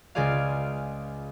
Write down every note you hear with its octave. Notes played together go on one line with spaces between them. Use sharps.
C#2 C#3 F4 G#4 D5 F5